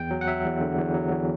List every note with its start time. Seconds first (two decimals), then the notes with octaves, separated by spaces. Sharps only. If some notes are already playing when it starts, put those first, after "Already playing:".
Already playing: E2 G5
0.11 F#3
0.21 F#5
0.27 F#3 E5
0.44 E2
0.61 D3
0.77 E2
0.94 F#3
1.10 E2